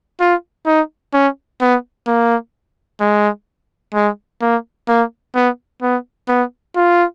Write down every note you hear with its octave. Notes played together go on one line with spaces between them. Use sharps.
F4
D#4
C#4
B3
A#3
G#3
G#3
A#3
A#3
B3
B3
B3
F4